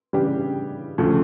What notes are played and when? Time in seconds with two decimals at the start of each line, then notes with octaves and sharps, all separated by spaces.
0.13 C#3 E3 G3 D4 G4
0.98 D2 C#3 F3 A3